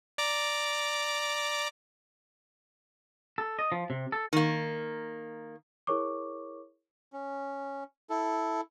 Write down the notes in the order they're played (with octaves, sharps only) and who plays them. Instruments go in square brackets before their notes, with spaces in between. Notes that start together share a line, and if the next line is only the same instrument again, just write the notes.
[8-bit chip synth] D5 A#5 D6
[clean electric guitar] A4
D#5
F3
C3
A4
[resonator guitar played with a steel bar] D#3 A#3
[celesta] E4 G#4 A#4 C#5 C#6 D6
[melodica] C#4
E4 A4